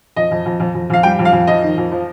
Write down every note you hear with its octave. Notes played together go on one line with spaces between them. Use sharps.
F2 D#5
F2
F2
F2
F2
F2 F5
G3 G5
F2
F5
F2
F2 D#5
D#3
F2
F3